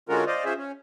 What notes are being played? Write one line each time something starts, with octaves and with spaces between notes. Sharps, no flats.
D3 G#3 C#4 F4 F#4 A#4
C5 D5 D#5 F5
F3 C#4 G#4 C5 E5
C#4